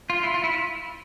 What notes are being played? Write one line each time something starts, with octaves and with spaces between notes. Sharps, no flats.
F4
E4
F4
E4